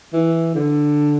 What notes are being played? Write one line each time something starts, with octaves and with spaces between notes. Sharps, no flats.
E3
D3